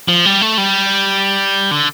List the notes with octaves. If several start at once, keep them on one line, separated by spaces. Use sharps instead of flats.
F3
G3
A3
G3
D3